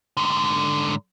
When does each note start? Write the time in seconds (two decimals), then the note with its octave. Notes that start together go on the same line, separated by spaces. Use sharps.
0.17 G#2 D3